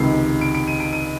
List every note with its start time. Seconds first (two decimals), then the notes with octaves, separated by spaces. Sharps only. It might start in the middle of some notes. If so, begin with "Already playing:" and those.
Already playing: C#2 C3 D#3 C7
0.41 D7
0.55 D7
0.68 D#7
0.80 D7
0.93 D#7